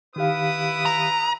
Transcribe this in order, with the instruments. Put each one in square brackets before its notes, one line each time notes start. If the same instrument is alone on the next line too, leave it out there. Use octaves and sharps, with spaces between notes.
[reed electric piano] D#3 G4 F5 [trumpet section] E4 B4 D#6
[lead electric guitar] A#5